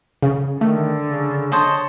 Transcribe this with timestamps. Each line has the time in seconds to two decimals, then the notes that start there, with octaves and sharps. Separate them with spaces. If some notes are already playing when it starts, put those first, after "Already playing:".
0.22 C#3
0.61 D3 D#3 A3
1.05 C#3
1.52 C5 C#5 D#5 A5